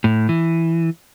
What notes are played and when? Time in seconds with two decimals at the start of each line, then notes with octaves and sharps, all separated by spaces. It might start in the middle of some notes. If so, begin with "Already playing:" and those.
0.04 A2
0.29 E3